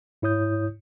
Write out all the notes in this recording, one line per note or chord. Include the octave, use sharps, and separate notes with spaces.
G#2 E4 C#5 D#6 G6